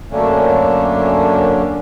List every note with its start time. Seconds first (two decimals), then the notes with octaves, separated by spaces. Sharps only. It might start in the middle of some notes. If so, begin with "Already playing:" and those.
0.11 F#2 D3 A3 A#3 C#4 D4